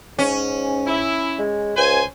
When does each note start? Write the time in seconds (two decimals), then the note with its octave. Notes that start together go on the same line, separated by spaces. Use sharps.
0.19 G#2 C#4
0.87 E4
1.39 G#3
1.77 C#2 C5 G#5